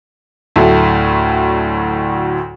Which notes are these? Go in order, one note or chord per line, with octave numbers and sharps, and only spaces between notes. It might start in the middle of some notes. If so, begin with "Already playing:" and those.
D2 A2 F#3 A3